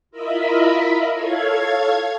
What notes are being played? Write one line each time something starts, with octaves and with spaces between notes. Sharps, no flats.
E4 F4 A#4 D#5 E5 B5
A4 C#5 F5 G#6